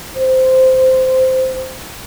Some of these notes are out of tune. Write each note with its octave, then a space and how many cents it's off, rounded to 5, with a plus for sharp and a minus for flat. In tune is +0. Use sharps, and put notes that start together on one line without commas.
C5 -10